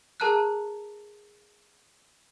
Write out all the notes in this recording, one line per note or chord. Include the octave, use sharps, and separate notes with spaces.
G#4 A#4 A5 A#5 F6 F#6